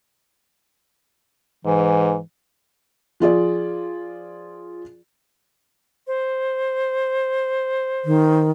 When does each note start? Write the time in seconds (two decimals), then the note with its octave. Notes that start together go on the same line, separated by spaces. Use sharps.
1.65 G#2 E3
3.20 F3 F4 G#4 D5
6.07 C5
8.05 D#3